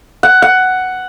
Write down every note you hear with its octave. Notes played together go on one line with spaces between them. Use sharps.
F#5
F#5